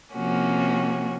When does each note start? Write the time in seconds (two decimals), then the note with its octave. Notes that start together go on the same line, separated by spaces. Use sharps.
0.13 C3 F3 A#3 C#4 F#4